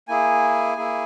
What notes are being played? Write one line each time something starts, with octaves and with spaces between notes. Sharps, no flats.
A#3 E4 G#4 G#5
A#3 E4 G#4